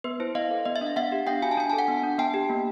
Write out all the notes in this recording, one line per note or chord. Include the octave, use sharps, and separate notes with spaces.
B3 B4
E4 C5
B3 D#5 F5
A4
B3 D#5
E5
D4
F5
B3 E5 F#5
G4
D4 F5 G5
F#4 G#5
A5
D4 G#5
A4 A5
F#5 G#5
B3
D4
B3 G5 A5
G4
A#3